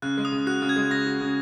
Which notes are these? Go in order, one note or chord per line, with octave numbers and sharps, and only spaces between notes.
C#3 F#6
G#3
D#6
C#3
F#4 F#6
C#3
G#6
G#3
C#3 A#6
F#4
C#3